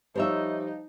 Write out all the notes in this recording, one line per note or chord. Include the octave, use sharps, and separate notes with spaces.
F3 G3 D#4 C5 C#5 E5